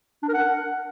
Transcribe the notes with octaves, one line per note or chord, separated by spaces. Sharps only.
D4
A#4
F#5